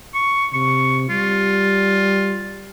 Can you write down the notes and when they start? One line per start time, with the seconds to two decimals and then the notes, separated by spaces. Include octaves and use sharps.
0.15 C#6
0.54 C3 C#6
1.10 G3 F4